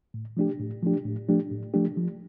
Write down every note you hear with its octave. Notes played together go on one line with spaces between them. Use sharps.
A2
F3 A3 D4 G4
A2
F3 A3 D4 G4
A2
F3 A3 D4 G4
A2
F3 A3 D4 G4
F3